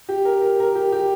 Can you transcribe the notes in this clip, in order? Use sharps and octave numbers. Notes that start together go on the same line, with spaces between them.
G4
A#4
A#4
A#4
G4
G4